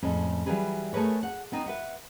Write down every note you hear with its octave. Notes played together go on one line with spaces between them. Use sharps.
F2 A2 G#3 C#4
E3 F#3 G3 G#4 B4
A3 G#4 A#4 B4 C#5
F#5
B3 C4 D#4
B4 E5 F#5